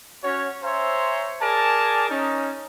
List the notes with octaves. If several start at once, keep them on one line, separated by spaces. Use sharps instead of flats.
C#4 F#4 C#5
C5 C#5 E5 G#5 A#5 C6
G#4 A#4 D5 G#5 A5
C#4 D#4